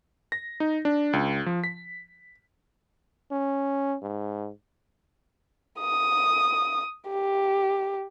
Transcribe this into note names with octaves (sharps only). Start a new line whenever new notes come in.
A#6
D#4
D4
C#2
F3
B6
C#4
G#2
D#6
G4